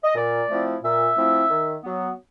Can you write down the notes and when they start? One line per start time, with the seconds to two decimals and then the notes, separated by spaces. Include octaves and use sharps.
0.04 D#5
0.15 A#2 D5
0.49 F3 A3 C4 E4
0.83 A#2 E5
1.16 F3 A3 C4 E4
1.49 D#3
1.83 F#3 B3